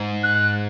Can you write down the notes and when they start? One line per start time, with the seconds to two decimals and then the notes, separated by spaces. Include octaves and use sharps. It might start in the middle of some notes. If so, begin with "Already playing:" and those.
Already playing: G#2
0.23 F#6